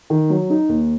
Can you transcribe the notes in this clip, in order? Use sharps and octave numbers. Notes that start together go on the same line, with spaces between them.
D#3
F#3
D#4
D#2